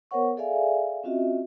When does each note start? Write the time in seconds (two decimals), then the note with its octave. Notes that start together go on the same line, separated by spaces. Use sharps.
0.11 B3 A#4 C5 C#5 F#5 C#6
0.37 G#4 A4 D5 E5 F5 G#5
1.04 C4 C#4 F4 F#4 D#5 E5